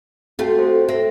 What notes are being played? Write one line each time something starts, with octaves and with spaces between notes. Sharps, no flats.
A3 C4 F4 F#4 G5
A4 C5
C4 E5 A#6